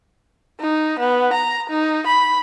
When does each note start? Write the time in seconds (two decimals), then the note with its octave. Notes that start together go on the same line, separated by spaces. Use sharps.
0.60 D#4
0.99 B3
1.33 A#5
1.70 D#4
2.07 B5